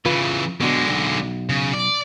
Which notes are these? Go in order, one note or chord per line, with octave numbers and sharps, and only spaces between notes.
C#3 E3 F4 B4
B2 D3 F#3 G#3 D4
B1
C#3
D5